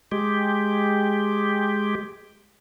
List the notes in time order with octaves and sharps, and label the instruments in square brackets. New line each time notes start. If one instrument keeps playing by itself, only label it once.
[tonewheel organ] G#3 G4